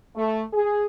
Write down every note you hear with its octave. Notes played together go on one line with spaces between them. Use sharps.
A3
G#4